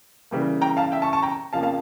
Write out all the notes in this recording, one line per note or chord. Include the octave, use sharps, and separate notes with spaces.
C#3 E3 G3 A#3
G5 A#5
F5 A5
E5 G5
A5 C#6
A5 C#6
G5 A#5
F2 C#3 F3 A#3 F5 A5
F5 A5